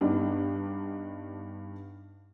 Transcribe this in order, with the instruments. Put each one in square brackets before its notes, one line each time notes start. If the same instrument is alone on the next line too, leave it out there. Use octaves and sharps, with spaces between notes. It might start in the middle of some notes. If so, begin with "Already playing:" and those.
[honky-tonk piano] G2 B3 D4 D#4